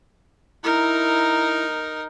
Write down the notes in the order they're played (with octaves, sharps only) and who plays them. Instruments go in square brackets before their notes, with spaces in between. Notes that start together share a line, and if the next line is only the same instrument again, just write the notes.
[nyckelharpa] D#4 A#4 [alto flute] E4